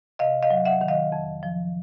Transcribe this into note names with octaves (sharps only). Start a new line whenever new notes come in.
C3 D#5 F5
D#5 F5
F#3
E5 F#5
D#3
D#5 F5
F2
F3